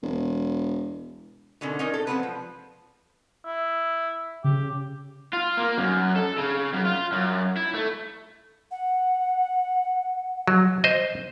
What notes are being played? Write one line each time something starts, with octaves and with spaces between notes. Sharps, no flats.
E1
B2 D3 D#3 C#4
C#4 D#4 A#4 C#5
A4
F3 G#3 A3 B3 C4 B4
F3
E4
C#3 G4
F4
A#3
F#2
A4
C#3
F#2
F4
F#2
E4
A3
F#5
F#3
C5 D#5